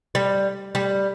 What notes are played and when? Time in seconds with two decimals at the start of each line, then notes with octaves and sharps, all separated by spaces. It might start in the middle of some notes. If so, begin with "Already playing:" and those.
0.15 G3
0.75 G3